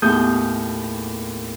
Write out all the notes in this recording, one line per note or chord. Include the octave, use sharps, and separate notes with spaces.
D#2 A2 B3 G#4 D#6 G6